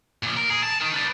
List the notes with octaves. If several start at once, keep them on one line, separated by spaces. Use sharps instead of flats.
A#2 F3
A#4
G#4
A5
D#4 A#4
B4 D5